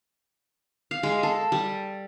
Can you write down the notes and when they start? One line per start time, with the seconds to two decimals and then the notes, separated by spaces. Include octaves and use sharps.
0.91 F5
1.03 G#3
1.23 A4
1.52 G3